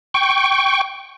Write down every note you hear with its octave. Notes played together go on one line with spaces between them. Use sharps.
G5 C#6